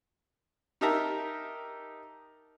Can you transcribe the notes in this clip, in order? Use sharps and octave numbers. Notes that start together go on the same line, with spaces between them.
D#4 G4 A#4 E5 A5 A#5